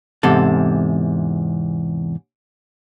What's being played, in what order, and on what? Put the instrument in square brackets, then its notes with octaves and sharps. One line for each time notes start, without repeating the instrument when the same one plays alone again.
[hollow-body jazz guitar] E2 G#2 C3 A4